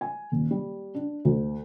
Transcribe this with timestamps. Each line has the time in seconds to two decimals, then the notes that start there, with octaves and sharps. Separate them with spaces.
0.01 G#5
0.32 D#1
0.51 G3
0.95 D4
1.25 D2